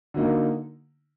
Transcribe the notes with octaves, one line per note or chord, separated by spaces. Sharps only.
D3 F#3 A#3 D#4